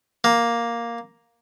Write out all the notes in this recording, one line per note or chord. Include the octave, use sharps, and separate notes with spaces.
A#3